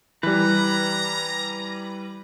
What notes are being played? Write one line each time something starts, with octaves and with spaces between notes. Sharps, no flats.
E3 G3 B4 A#5